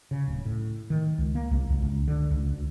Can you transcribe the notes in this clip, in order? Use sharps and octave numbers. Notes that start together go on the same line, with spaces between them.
C#3
D1
A2
D#3
C#2
A#3
C2
C#2
C#2
D3
C#2
D2